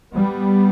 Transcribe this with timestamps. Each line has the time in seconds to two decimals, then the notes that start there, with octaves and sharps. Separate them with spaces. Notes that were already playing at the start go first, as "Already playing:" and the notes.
0.14 G3 B3